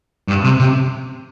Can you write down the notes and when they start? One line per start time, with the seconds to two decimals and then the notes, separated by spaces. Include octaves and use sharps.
0.28 G2
0.44 C3
0.59 C3